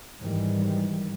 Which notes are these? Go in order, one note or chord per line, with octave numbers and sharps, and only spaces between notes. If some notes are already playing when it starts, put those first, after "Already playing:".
G#2 D#3 E3 G3